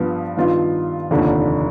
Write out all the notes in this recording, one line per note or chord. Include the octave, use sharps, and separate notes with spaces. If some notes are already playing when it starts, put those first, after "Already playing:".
Already playing: G2 F3 B3
G2 D#3 B3 F4
F1 D#2 D3 F3